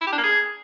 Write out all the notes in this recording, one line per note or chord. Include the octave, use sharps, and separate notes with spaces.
E4
G4
D4
A#3
G#4